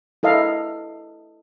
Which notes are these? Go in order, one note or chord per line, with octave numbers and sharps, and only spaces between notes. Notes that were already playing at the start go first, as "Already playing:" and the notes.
E4 A4 D#5 F5